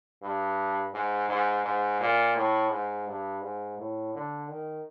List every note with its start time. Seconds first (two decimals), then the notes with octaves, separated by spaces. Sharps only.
0.22 G2
0.94 G#2
1.29 G#2
1.65 G#2
2.00 A#2
2.36 A2
2.71 G#2
3.07 G2
3.42 G#2
3.78 A2
4.14 D3
4.49 D#3